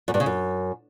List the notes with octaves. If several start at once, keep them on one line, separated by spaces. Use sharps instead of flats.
F#2
G2
C#3
F#2